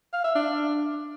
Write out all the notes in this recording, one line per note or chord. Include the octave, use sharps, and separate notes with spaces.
F5
E5
D4